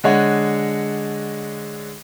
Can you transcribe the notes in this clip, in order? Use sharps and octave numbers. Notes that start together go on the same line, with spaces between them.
D3 G#3 D4 C#5 D#5 F#5